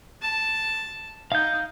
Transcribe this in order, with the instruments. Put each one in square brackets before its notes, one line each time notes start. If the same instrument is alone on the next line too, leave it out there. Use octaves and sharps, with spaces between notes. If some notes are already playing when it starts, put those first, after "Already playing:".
[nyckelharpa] A5
[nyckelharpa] D#4 [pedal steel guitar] F5 G6